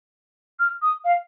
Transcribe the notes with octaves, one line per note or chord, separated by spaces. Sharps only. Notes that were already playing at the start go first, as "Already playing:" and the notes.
F6
D#6
F5